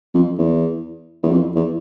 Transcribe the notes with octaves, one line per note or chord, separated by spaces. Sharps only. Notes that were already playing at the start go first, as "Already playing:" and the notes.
F2
E2
E2
F2
E2